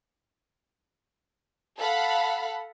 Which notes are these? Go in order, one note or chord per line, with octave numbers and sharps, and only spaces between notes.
A4 F5 F#5 B5